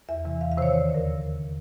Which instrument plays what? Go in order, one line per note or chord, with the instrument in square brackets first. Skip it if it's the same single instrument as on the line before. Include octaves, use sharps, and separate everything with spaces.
[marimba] E2 E5
C3 E3
E2 F5
F5
C3 D#3 C5 C#5
D#2 D5
D3
A#4